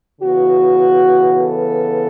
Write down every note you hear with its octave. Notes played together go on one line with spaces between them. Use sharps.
C#3 E3 B3 F#4
A4